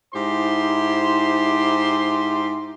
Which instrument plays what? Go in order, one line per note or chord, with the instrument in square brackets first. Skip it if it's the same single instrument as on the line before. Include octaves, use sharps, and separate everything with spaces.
[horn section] G#2 E4 G4 C5 C6